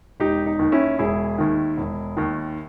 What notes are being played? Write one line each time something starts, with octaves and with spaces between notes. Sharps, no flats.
E1 D#4 G4
D#4
D#2 D#3
C#4 E4
E1 E4 G#4
D#2 D#3
E1
D#2 D#3